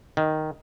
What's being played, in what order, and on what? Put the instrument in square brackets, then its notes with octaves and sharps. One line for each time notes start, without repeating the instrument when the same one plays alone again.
[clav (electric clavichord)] D#3